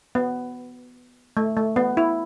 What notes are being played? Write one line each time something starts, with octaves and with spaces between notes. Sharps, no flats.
B3
A3
A3
B3
E4